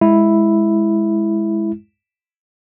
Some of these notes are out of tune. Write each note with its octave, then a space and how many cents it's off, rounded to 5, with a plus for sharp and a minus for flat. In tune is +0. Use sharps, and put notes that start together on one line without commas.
G#3 +0 E4 +0